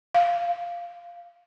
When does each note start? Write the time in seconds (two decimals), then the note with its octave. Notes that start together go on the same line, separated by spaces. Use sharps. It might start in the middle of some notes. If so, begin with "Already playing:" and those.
0.15 F5